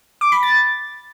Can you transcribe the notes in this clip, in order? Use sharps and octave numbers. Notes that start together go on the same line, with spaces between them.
D6
B5
A6